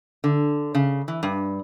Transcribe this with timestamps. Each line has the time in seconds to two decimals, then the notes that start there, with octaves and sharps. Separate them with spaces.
0.24 D3
0.75 C#3
1.08 E3
1.23 G2